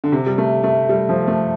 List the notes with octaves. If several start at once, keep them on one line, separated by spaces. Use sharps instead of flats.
D3
C3
G3
A3
A3
G3
F3
A3